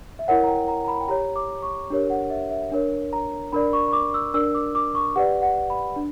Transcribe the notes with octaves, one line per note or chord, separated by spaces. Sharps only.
E5
E4 A#4 C#5 F#5
A#5
G5
A#5
A#5
B5
G5
G4 C#5 A#5
D6
C#6
D4 G4 A#4 C#5
F#5
E5
E5
D4 A#4 C#5
A#5
D4 A#4 D5 B5
C#6
C#6
D6
E6
D4 A#4 D5 E6
D6
D6
C#6
G4 B4 D5 F#5
F#5
B5
D4